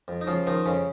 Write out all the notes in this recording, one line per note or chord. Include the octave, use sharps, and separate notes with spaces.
F2
D#4
C#3 F3 F4
D#3 F3 D#4
F2 C#3 C#4